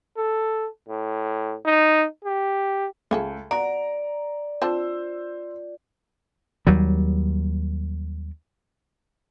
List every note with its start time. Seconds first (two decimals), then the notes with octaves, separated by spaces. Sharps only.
0.16 A4
0.89 A2
1.65 D#4
2.25 G4
3.11 C#2 A3 G#4 A4
3.51 B3 F#4 D5 A#5
4.62 C4 D4 F4 C5 A5 E6
6.67 D#2 F#3 G3